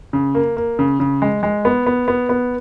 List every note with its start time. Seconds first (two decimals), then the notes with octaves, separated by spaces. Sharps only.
0.13 C#3
0.35 A#3
0.57 A#3
0.79 C#3
1.00 C#3
1.22 G#3
1.43 G#3
1.65 B3
1.86 B3
2.08 B3
2.29 B3